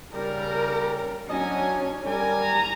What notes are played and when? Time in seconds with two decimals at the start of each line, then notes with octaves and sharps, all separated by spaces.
0.13 C#3 G3 A#4
1.29 F#3 C#4 D4 D#5 G#5
2.05 G3 A#4 D5 G#5
2.41 A#5